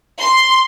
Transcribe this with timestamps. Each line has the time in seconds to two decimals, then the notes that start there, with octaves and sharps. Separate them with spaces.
0.21 C6